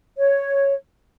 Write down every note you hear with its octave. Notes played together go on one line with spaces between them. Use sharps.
C#5